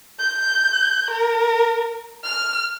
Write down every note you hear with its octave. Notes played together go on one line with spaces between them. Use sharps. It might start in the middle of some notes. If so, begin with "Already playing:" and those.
G6
A#4
F6